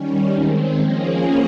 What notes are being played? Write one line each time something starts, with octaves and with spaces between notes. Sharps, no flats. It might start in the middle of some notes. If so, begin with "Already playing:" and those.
Already playing: D#3 G3 C#4
D#3 G#3 C4
F3 A#3 C#4 G#4